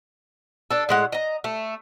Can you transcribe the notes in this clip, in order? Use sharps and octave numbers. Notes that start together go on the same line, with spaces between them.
D4 A4
A2 G#3 F#5
D#5 A#5
A3